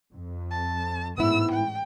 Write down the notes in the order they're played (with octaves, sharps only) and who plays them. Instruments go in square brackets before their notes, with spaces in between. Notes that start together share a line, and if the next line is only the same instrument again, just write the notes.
[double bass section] F2
[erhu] A5
[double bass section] A1 G#2 [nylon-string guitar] B3 E4 [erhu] E6
[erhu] G5